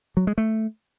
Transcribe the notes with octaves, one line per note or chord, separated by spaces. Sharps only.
F#3
G#3
A3